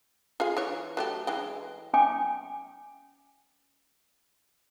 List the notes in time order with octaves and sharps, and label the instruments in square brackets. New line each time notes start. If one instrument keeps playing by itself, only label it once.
[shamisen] F4 G#4 F5
E3 C#5
F#3 A3 G4
E3 G#3 G5
[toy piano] C#4 G5 G#5 D6